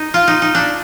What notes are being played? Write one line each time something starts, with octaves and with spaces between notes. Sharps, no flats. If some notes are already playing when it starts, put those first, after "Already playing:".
Already playing: D#4
F4
D#4
D#4
D4